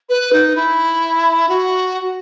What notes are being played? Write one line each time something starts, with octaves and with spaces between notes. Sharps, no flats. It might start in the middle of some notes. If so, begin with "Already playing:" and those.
B4
D#4
E4
F#4